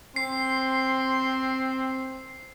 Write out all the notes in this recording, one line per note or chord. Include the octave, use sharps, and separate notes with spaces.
C4 C6 C7